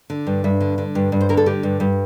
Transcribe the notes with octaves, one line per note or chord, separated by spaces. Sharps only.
D3
G2
G2 E5
D3
D3
G2
G2
C5
D3 A#4
A4
D3 G4
G2
G2